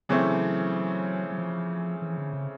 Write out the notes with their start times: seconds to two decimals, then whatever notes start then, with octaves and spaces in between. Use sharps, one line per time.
0.09 C#3 E3 F#3 A3 C4 E4
1.32 F#3
1.38 F3
2.02 E3
2.18 D3
2.33 C#3